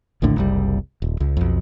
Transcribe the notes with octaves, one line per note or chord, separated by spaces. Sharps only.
A#1 D#2 A2 D3
F#1 C2 G3
D#1
C#2
B1 F2